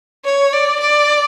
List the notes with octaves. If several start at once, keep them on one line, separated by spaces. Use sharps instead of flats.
C#5
D5
D5